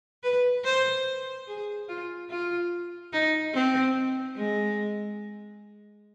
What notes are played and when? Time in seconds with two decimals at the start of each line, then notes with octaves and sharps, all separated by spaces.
0.23 B4
0.64 C5
1.47 G#4
1.88 F4
2.30 F4
3.13 D#4
3.54 C4
4.36 G#3